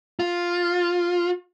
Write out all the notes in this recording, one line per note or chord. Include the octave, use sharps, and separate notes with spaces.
F4